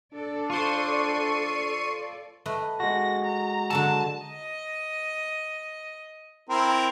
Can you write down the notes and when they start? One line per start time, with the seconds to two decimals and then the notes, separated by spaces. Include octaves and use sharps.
0.13 D4 A4 D5
0.50 F4 C5 C#6 C7 D#7
2.46 A3 B4 D#5
2.80 G#3 F#4 A#6
3.25 A#5
3.70 D3 F#3 A4 A5
4.25 D#5
6.49 C4 E4 A#4